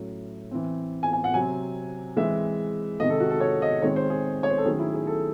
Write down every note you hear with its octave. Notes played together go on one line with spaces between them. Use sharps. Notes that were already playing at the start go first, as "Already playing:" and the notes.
Already playing: A2 F#3 C#4
E3 C4
G#5
G#5
F#5
C3 F#3 C4 G#5
E3 G#3 C4 E5
C3 D#3 G#3 D#5
A4
F#4
A4
C#5
D#5
D#3 G#3 C4 C#5
C5
G#4
C#5
C5
A4
D#3 F#3 A3 C#4 G#4
E4
G#4
A4